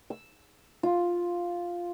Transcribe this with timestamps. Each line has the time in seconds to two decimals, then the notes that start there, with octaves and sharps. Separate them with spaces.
0.10 E6
0.83 F4